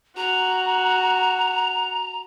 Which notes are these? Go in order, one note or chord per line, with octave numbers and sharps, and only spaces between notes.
F#4 A#5